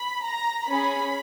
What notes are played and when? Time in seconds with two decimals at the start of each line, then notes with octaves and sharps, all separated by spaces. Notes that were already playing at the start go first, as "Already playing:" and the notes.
Already playing: B5
0.23 A#5
0.68 C#4 G#4 B5